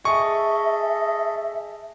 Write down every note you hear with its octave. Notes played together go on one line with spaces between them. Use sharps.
G#4 A4 D#5 E5 C#6